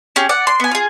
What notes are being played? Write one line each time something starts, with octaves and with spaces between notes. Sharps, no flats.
C#4 G4 G#4
D5 F#5
C6
B3 G#5
F4 G#4